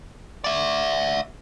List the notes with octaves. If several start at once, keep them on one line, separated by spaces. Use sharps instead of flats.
D5 E5